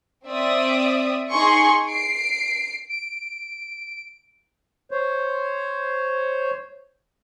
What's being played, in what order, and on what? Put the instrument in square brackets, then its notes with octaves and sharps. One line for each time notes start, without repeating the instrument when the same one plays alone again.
[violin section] C4 D5 E5 D#6
D#4 G#4 G#5 C6 C#6
C7 D7
[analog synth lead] D7
[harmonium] C5 C#5